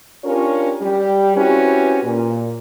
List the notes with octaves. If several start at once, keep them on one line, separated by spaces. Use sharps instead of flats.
C#4 D4 F4 G4 A#4 C#5
G3 G4
C4 C#4 E4 F#4 G4 B4
A#2